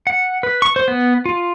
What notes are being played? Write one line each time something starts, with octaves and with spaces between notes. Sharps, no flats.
F#5
B4
C#6
C5
B3
F4